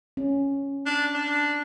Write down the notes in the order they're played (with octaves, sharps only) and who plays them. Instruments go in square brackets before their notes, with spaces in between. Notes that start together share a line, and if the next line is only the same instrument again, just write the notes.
[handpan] C#4
[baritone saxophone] D4
D4